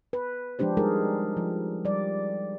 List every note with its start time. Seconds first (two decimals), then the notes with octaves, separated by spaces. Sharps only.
0.13 B4
0.59 F3 G#3 D4 G4 C5
0.77 G3 G#3 D#4 G#4 A#4
1.37 F3
1.85 G3 D5